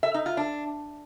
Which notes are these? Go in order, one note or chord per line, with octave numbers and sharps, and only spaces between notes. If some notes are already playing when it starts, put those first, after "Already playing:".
E5
D#4
F4
D4